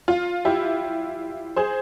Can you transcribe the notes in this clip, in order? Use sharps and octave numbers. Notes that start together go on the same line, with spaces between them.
F4
E4 G4
G#4 C5